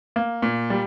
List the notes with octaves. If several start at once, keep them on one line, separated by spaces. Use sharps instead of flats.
A#3
A#2
G3